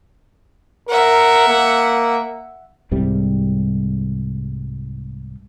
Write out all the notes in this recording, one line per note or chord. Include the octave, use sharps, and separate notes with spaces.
A#4 E5 F#5
A#3
C2 G#2 C3 G3